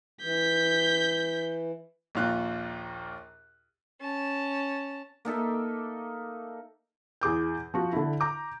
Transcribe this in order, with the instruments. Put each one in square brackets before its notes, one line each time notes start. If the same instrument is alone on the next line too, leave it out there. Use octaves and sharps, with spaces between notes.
[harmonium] E3 [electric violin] G6 B6
[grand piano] A#1 D#2 F4 F#6
[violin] C#4 A5
[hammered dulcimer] A#3 D#4 A4 E5
[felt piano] E2 G#4 D6 G6
F3 F#4
D3 E4
A#5 D6 G6